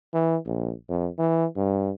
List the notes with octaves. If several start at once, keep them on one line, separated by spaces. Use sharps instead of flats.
E3
A#1
F2
E3
G2